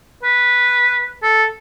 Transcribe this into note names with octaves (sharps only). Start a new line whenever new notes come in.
B4
A4